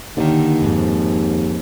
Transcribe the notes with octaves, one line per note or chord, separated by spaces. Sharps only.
D#2 D3 D#3
F2 G#2